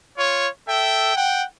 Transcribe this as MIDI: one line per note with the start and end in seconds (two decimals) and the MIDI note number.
0.17 0.48 65
0.17 0.48 73
0.68 1.12 69
0.68 1.12 76
0.68 1.12 79
1.16 1.44 78
1.16 1.44 79